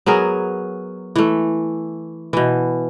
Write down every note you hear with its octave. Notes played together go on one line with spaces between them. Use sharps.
F#3 B3 G#4 A#4
E3 A3
B2 E3